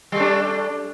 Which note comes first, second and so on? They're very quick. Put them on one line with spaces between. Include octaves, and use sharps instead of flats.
G3 A3 D4